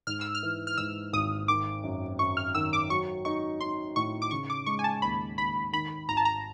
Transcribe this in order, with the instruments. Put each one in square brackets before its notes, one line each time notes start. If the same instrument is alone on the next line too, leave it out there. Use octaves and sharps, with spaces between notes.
[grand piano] G#2 [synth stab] F6
[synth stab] E6
F6
[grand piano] E3
[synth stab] F6
[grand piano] G#2 [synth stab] E6
[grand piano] G#1 [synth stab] D#6
[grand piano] D#3 [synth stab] D6
[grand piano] F#2
[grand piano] F#2 [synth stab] C#6
[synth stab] F6
[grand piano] D#3 [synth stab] E6
[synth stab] D6
[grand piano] F#3 [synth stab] C#6
[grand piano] D#4 [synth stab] C#6
[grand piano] D#4 [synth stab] C6
[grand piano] A2 [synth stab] C#6
[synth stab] D6
[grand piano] C#3 [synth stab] C#6
[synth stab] D6
[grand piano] G#3 [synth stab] C#6
[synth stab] G#5
A5
[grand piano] D#2 [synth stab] B5
[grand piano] D#2 [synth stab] B5
[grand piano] D#3 [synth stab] B5
[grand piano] G#1 [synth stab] A#5
[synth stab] A5
A#5